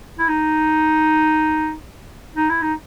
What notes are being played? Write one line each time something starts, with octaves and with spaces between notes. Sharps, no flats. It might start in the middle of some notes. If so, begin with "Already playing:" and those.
E4
D#4
D#4
E4
D#4